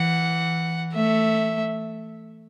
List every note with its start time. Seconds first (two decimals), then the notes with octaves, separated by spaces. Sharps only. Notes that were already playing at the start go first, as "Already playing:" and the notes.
Already playing: E3 F#5
0.94 A3 E5